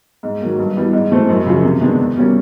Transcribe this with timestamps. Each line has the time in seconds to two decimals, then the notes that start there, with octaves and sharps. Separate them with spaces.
0.23 G#2
0.41 D#3 F#3 A#3
0.59 G2
0.76 E3 G3 B3 E4
0.93 G#2
1.11 E3 A3 C4
1.29 F#2
1.46 C#3 F3
1.63 C3
1.80 D#3 G#3 B3 D4
1.99 E2
2.16 B2 G3 A#3 C#4